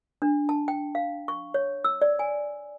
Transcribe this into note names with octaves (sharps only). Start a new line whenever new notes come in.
D4
A5
G5
F5
C#6
C#5
E6
D5
G#5